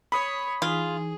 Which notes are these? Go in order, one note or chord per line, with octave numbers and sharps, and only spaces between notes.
C#5 B5 D#6
E3 D#4 F4 G#4